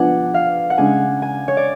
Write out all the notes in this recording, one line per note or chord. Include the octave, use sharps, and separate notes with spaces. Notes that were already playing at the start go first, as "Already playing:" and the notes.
Already playing: F3 B3 D4 F#5 G#5
F5
F#5
C#3 G#3 D4 G#5
G#5
C#5
D5